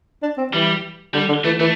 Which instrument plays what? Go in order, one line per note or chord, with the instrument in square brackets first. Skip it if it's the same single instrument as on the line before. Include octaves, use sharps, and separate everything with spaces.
[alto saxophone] D4
C4
[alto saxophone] E3 [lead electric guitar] G3
[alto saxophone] D3 [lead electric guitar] G3
[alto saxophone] D3
[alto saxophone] E3 [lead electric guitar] A3
[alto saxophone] E3 [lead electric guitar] A3